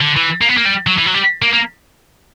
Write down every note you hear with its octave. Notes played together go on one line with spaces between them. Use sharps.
D3
E3
A#3
B3
A#3
G3
F#3
E3
F#3
G3
A#3
A#3